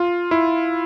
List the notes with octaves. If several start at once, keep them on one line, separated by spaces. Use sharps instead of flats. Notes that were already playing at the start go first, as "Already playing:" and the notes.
Already playing: F4
E4